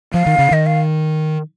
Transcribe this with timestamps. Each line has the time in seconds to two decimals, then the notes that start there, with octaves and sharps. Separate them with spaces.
0.14 F3 F5
0.26 D#3
0.39 C#3
0.51 D#3 D#5
0.66 F5